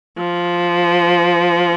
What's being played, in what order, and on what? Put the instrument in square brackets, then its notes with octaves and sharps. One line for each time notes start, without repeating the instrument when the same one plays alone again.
[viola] F3